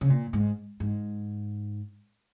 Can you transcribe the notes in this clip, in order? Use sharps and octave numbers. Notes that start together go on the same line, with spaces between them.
C#3
A#2
G#2
G#2